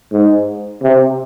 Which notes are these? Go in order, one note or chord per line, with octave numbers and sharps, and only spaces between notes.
G#2
C3